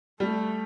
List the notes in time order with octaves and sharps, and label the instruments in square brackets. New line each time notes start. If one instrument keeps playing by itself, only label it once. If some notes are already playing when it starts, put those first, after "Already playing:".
[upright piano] G3 [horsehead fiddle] A3